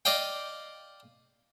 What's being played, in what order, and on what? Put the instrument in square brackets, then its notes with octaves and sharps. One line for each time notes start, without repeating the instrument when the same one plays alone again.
[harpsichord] D5 D#5 F5 G5